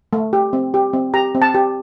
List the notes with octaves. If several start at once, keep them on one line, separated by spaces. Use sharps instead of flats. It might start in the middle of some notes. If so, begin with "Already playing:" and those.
A3
G4
C4
G4
C4
G4 A#5
C4
A5
G4